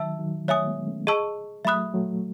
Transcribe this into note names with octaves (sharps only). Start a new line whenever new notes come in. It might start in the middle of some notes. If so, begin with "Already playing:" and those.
Already playing: D#3 F#3 E5 A5 E6
D#3 F#3
F#3 A3 C#5 E5 G#5 D#6
G#3 B3
A3 C#4
G#4 D#5 A5 C#6 E6
F#3 A3 E5 B5 D#6 F#6
F#3 A3